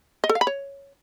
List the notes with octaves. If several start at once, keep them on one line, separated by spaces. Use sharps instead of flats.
D#5
A4
F5
B5
C#5